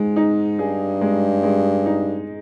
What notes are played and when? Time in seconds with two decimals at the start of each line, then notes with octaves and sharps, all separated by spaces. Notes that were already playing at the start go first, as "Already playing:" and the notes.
Already playing: G#2 G#3
0.16 D#4
0.59 G2 G#4
1.01 G#3
1.44 G#3
1.86 D#4